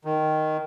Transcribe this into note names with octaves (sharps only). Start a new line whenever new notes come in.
D#3